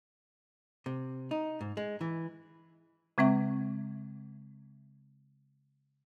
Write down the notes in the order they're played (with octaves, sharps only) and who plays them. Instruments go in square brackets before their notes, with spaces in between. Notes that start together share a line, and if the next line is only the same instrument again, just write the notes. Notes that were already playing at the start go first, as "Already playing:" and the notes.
[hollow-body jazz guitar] C3
D#4
G#2
G#3
E3
[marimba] C#3 G#3 C4 E5 C#6